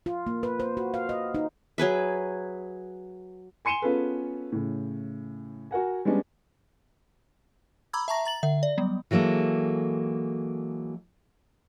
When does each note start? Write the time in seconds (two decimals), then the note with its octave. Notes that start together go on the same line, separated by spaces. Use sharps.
0.06 F4
0.27 A#3
0.43 B4
0.60 C5
0.77 F#4
0.94 F5
1.09 D#5
1.35 D#4
1.78 F#3 G#4 B4 E5
3.65 G#5 C6 C#7 D#7 E7 G7
3.82 B3 C#4 F4 G#4 A4 B4
4.52 A2 C#3
5.71 F#4 A#4 F#5 G#5
6.05 G3 G#3 B3 C#4 D4
7.93 A#5 B5 D6 E6 G#6
8.08 E5 A5 A#5 C#6 A#6
8.25 A#5 A6 F#7
8.43 D3 E5
8.63 D5
8.78 F#3 G3 B3
9.11 E3 F#3 G#3 A#3 A4